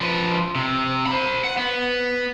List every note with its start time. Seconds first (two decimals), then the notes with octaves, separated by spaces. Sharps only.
0.01 F3 B4
0.55 C3
1.06 C5 B5
1.44 F#5
1.57 B3